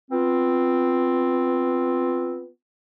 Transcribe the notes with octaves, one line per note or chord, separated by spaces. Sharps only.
B3 C4 F4